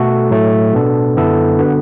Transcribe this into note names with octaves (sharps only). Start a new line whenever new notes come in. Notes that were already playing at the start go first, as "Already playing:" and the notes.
Already playing: B2 A3 F#4 A4
A2 F#3 A3
B2 B3 D4 A4
F#2 D3 B3 E4 A4
D3 B3 F#4 B4